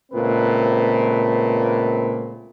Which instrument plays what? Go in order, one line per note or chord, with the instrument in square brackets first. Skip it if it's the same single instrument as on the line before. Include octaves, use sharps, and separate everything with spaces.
[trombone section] C#2 A#2 A3 C4 B4